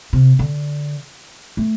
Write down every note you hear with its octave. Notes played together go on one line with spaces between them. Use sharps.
C3
D3
A3